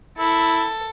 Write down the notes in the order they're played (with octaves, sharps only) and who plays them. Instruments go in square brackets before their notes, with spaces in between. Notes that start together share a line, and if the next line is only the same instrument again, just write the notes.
[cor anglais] E4 [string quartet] A4